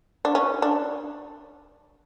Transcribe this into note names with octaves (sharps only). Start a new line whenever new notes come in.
D4
C#4
D4